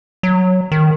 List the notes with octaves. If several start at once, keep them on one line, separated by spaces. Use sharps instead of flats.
F#3
D#3